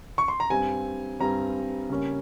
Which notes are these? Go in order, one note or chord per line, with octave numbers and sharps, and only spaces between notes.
C#6
C6
A#5
G2 G3 C4 G#5
G2 G3 C4 A#5
C#3 G3 A#3 C#4